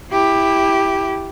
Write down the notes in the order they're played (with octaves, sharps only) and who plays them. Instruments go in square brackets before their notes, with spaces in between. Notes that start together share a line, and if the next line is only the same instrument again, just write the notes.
[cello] E4 G4